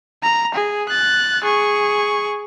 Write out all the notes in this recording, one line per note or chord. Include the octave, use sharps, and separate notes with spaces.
A#5
G#4
F#6 A6
G#4 C#6